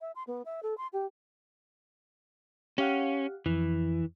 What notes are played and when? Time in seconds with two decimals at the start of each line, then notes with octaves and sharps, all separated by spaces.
0.01 E5
0.16 C6
0.27 B3
0.45 E5
0.63 A4
0.78 C6
0.93 G4
2.78 C#4 G4 F5 F#5
3.46 F2 E3